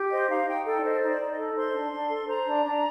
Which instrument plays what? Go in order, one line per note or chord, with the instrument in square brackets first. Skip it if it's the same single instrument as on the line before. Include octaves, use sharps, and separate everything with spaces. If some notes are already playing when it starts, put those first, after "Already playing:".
Already playing: [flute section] G4
C5 D#5
D#4 F5
D#4 G5
A4 G5
D5
C5 D#5
D#4
D5
D#4
D#5
A4
C5 C6
D4
D4
A4
C5 A#5
D4
D4